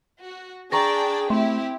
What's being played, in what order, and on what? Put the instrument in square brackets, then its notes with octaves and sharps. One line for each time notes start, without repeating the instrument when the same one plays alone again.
[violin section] F#4
[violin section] D4 D5 G5 [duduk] G#4 [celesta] A#5 C#6 A#6
[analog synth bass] A3 [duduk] C4 [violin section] E4 G4 [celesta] C6